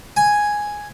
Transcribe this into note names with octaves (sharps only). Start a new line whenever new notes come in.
G#5